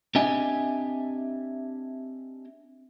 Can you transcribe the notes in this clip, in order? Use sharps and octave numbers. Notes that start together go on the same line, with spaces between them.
C4 D4 G4 D#5 E5 G#5